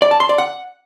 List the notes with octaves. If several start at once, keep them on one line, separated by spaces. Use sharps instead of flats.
D5
A5
C6
D5
F#5